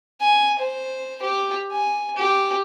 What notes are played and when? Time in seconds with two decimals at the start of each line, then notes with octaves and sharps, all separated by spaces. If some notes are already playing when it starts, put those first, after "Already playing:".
0.21 G#5
0.58 C5
1.22 G4
1.71 G#5
2.16 G4